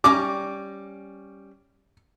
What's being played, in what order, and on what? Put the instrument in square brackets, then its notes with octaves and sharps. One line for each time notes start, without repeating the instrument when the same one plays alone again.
[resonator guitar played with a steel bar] G3 C#4 A#5 [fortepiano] D6